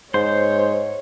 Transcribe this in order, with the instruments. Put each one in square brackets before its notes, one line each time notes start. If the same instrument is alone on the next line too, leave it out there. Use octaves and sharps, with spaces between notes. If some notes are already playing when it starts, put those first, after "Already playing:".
[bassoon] G#2 [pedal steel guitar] C5 [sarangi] C#5